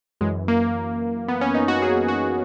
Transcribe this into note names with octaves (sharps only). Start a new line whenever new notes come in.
F#2 E3 G#3
A#3
B3
C#4
D#4
F#4
G#4
F#4